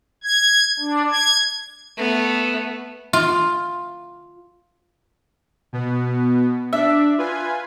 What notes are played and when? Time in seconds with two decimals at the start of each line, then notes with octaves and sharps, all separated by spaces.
0.24 G#6
0.79 D4
1.11 G#6
1.97 A3 B3
3.13 F4
5.73 B2 B3
6.73 D4 E5
7.18 F4 B4 G#5